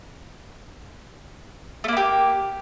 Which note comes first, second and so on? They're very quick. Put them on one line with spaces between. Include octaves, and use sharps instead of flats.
A3 A#3 E4 G4